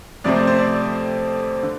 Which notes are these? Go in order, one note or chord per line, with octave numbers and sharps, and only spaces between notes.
F2 C3 A3 C4 D5
C5
C5
D5
D3